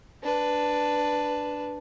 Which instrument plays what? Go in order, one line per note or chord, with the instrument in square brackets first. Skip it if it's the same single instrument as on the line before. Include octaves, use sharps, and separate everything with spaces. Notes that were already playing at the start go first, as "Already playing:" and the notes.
[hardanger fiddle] D4 B4